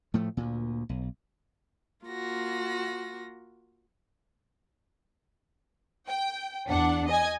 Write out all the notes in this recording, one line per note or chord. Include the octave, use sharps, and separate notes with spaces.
A2 F3 A3
D2 A#2
B1
A#3 F4 F#4 A#6
G5
E2 D4 F#5
D#5 G#5